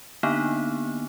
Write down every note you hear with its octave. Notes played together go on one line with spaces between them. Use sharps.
D3 A#3 B3 D4 D#4